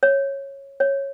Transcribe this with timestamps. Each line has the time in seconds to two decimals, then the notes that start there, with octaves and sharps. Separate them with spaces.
0.03 C#5
0.80 C#5